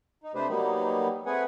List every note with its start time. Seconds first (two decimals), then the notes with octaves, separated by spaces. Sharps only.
0.24 D#4
0.35 C3 A3 D4 G4 B4 C5
0.49 F#3 G3 A#3 B3 D#4 G4
1.26 A3 C4 G#4 B4 F#5 G#5